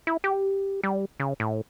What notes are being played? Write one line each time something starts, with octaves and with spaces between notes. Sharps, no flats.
E4
G4
G3
C#3
A2